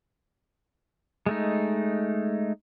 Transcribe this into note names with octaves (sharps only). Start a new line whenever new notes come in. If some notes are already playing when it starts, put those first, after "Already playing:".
G#3 A3 D#4